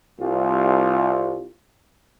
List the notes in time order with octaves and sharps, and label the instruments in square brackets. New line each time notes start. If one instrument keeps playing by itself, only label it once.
[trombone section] C2 F4